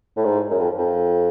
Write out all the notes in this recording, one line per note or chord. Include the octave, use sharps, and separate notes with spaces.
A2
G#2
F#2
F2
F2